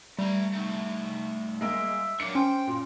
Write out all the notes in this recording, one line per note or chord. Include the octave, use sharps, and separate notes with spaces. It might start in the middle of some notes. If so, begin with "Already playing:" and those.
G3 A3 A#5
A3 D#4
G#3 A#3 E5
F#3 A#3 D4 C#7
C#4 C5 G5
A#2